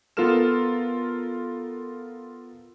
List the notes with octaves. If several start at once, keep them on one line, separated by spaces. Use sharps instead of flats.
B3 F4 A4 A#4 F6 E7